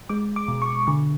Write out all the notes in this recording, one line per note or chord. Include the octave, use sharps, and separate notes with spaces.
G#3 D6
D6
B2
C#6
D3 C#6